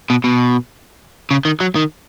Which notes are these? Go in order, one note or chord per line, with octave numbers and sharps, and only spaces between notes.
B2
B2
C#3
D#3
F#3
D#3